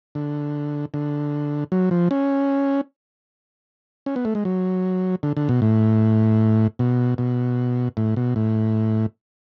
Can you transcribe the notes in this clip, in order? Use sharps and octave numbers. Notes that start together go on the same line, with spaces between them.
D3
D3
F#3
F3
C#4
C#4
B3
A3
G#3
F#3
D3
D3
B2
A2
B2
B2
A2
B2
A2